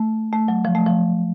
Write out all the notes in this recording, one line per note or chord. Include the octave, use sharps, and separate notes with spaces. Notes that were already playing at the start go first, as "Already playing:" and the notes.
Already playing: A3
A3
F#3
F3
A3
F3